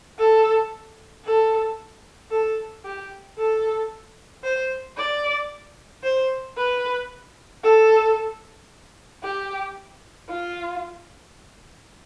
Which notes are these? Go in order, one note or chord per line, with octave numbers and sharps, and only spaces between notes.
A4
A4
A4
G4
A4
C5
D5
C5
B4
A4
G4
F4